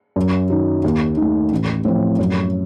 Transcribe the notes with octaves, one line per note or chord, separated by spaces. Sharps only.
F#2
D#3 F#3
D#2
D#3 A3
A1
A2 F3 C4
F#2